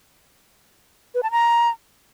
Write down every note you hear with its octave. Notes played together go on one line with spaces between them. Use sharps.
B4
A5
A#5